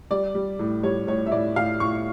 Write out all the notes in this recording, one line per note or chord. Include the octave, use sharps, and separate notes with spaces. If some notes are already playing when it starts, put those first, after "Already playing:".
G3 D5
G3
A2
G3 C#5
A2 C#5
E5
A2 D5
A2 F5
A2 C#6